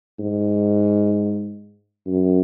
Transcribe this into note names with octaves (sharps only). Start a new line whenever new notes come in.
G#2
F#2